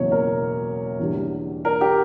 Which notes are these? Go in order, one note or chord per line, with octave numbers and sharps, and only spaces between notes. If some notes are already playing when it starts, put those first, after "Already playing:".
Already playing: F#1 E2 B2 F#3 C#5
A#4
E2 D3 G3
A#4
G4